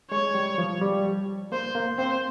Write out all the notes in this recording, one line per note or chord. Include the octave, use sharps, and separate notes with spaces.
G#3 C#5
G3
F3
G3
A#3 C5
A#3
C4 C5